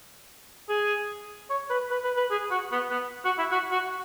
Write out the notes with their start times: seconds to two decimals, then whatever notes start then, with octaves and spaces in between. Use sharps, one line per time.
0.69 G#4
1.50 C#5
1.70 B4
1.91 B4
2.04 B4
2.17 B4
2.31 G#4
2.51 F#4
2.72 B3
2.91 B3
3.25 F#4
3.39 E4
3.52 F#4
3.72 F#4